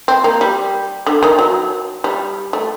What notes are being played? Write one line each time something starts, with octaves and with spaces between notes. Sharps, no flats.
C4
A#3
G3
D3
D#3
F#3
G3
A3